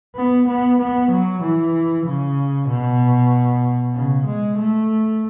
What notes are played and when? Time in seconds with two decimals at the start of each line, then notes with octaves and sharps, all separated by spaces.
0.15 B3
0.47 B3
0.78 B3
1.10 F#3
1.42 E3
2.06 C#3
2.68 B2
3.95 C#3
4.26 G#3
4.58 A3